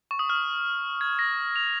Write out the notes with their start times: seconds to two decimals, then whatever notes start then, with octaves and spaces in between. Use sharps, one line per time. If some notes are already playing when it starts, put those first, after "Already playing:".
0.11 C#6
0.19 D#6
0.30 F6
1.01 G#6
1.19 A#6
1.56 F7